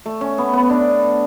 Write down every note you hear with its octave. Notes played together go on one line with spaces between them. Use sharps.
A3
C#4
B3
B3
D4